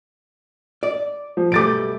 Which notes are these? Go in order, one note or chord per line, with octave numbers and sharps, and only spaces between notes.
D5
F3
B1 G3 A3 D6 A6 D7